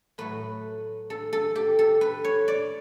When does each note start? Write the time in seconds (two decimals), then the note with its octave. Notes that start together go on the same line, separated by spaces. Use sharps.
0.18 A2 F#3 A3 B4
1.10 A4
1.33 A4
1.56 G4
1.79 A4
2.01 B4
2.24 C#5
2.48 D5